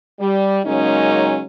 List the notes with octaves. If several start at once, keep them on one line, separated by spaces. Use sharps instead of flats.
G3
C#3 F#3 G#3 A#3 C#4 D#4